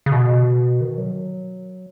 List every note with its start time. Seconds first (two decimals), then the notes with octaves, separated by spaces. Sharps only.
0.06 C#3
0.12 B2
0.81 D#3
0.98 F#3